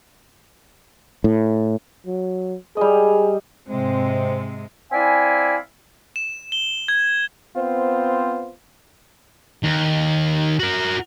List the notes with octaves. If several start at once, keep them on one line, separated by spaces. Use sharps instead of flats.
A2
F#3
G3 G#4 D#5
G#2 C3 G#3 C4
C4 E4 D5 E5 F5 G#5
E7
G7
G#6
B3 C4 F4 C5
D#2
F#4 A#4